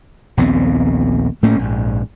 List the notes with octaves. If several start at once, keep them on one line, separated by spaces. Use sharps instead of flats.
A#1 D#2 B3 C4
A2 A3 A#3 C#4
A#1 G#2